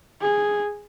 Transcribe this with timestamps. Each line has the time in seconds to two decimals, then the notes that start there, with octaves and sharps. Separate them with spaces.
0.21 G#4